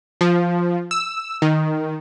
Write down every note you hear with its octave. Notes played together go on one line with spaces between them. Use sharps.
F3
E6
D#3